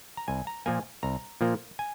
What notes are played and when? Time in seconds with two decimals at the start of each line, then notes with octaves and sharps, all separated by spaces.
0.17 A#5
0.28 C2 G#5
0.47 A#5
0.66 A#2 F3 A#3 G#5
1.03 C2 A#5
1.41 A#2 F3 A#3
1.79 G#5